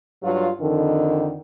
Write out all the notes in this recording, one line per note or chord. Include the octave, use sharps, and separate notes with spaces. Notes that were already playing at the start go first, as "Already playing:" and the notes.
G2 F#3 F4
F2 D3 D#3